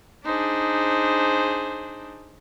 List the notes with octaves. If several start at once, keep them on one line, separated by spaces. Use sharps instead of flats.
D4 D#4 G#4 C5